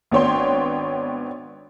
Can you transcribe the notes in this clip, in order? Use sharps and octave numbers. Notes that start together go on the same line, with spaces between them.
G#1 B3 D4 C#5 G5 C6